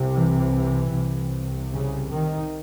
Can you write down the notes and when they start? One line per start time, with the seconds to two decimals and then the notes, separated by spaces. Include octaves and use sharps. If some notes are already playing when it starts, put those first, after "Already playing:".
Already playing: C2 C3
0.15 E3
0.94 C2 C3
1.71 C#3
2.11 D#3